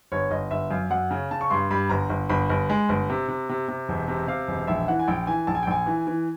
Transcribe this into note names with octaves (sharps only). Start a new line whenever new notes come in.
G1 C#5
G1 D#5
G1 E5
F#2 F5
F#2 F#5
C#3
C#3 A5
C#6
G2 C6
G2 B5
G1 A#5
G1
G1 B5
G1
G#3
G1
C3
C3
C3
C3
E1
C3
C3 F5
E1
A#1 E5
E3 F#5
G#5
A#1 G5
E3 G#5
A#1 A5
G#5
G5
A#1 G#5
E3
E3